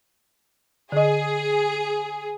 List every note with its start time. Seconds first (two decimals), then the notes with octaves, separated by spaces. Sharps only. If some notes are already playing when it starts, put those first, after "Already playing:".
0.92 D3 G#4 D#5